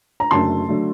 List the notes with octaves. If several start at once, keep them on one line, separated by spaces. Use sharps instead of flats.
A#5
F#1 F#2 D3 F#3 A3 A5 C6
D3 F#3 A3